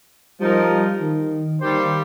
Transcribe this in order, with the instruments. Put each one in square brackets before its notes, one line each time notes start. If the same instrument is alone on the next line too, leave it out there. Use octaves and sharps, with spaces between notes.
[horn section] F3 D#4 A#4 [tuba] G3
[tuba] G3
D#3
[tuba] D#3 [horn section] G3 A#3 G4 C5